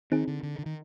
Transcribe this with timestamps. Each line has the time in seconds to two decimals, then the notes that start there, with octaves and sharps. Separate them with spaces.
0.12 D#3 C4 D#4 G#4
0.27 D3
0.43 D3
0.58 D3
0.66 D#3